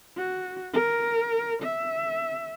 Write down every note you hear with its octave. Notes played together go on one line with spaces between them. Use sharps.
F#4
A#4
E5